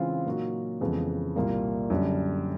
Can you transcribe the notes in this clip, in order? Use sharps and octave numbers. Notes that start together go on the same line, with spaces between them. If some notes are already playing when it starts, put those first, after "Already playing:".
Already playing: C#3 E3 G#3 C4 F4
A#2 F#3 A#3 D#4 F#4
F2 C#3 E3 G#3 B3
C2 A#2 G3 A#3
F#2 D3 G3